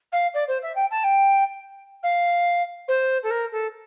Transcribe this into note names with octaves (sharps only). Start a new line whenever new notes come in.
F5
D5
C5
E5
G5
A5
G5
F5
C5
A4
A#4
A4